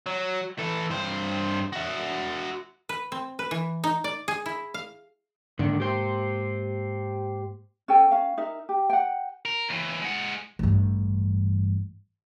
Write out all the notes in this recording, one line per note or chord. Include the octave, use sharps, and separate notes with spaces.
F#3
E3 A4
G2 C5
F#4 E5
B4
C4
B4
E3
D#4
D5
G#4
E4
F5
G#2 D3 D#3 A#3 D4
G4 C5
C#4 A4 G5 G#5
C#4 F5
D#4 A#4 E5
G4
F#5 G5
A#4
D#2 E3
G#3 F#5
A1 G2